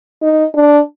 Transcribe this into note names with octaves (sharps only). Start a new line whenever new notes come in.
D#4
D4